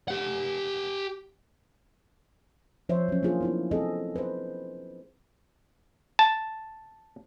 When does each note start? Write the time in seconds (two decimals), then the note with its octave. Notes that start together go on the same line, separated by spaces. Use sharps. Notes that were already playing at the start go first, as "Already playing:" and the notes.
0.08 G4 F#5
2.89 F3 C5 C#5 E5
3.08 F#3 C#4
3.23 A#3 D4 F4 G#4
3.41 B3 E4 F4
3.71 C4 G#4 A4 D#5
4.16 B4 C5
6.19 A5